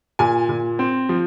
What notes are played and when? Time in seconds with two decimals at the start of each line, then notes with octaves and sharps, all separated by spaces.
0.19 A#2 G#5
0.49 A#2
0.79 C4
1.09 F3